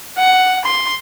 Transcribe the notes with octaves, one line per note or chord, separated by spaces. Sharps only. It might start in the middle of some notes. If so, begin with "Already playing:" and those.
F#5
C6